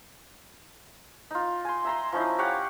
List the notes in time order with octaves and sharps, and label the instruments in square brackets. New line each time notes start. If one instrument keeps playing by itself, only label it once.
[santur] D#4 F4
G#5 C6
E5 A#5 C6
F3 C#4 D#4 E4
G4 C#5 F5 F#5